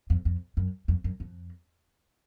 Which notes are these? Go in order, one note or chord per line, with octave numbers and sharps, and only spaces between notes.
F2
F2
F#2
F2
F#2
F2